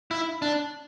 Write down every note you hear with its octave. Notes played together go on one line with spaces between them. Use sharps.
E4
D4